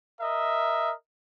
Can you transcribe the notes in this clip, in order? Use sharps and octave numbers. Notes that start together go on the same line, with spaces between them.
A#4 D#5 E5